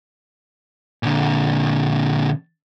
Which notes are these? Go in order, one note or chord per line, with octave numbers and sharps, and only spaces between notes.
A#2 D3